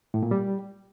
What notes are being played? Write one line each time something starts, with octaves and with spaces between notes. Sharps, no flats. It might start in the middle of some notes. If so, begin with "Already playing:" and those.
A2
A#2
G3